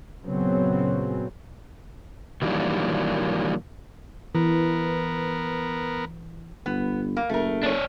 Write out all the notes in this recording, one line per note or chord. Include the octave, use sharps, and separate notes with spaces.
F#2 A#2 C#3 F#3 B3 C4
D#3 E3 F#3 G3 A#3 D4
E3 B3 A#4
G1 B3
A#3
F#1 A3 A#4
D4 C#5